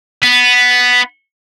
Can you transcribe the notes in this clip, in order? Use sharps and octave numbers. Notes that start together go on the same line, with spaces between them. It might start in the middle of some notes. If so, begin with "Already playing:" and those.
B3